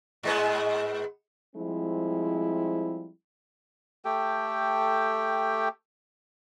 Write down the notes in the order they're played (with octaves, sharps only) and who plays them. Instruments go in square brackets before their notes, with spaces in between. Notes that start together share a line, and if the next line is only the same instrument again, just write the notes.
[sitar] G#2 G#3 B3
[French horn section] F3 G3 G#3 C4 E4
[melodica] A3 G4 A4 G5